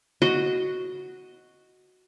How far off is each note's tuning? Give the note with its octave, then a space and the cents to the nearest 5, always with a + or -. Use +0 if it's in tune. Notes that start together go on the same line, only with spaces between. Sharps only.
F#4 +0 D#5 +0